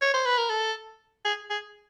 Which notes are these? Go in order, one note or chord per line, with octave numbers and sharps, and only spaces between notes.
C#5
C5
B4
A#4
A4
G#4
G#4